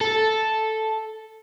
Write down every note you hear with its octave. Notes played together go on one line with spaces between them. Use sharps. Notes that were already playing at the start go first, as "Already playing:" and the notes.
A4